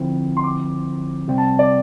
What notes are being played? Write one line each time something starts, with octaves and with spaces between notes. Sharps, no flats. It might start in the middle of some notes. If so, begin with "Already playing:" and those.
Already playing: D3 F3 C4 E4
C6
D6
C3 G3 C4
A5
D5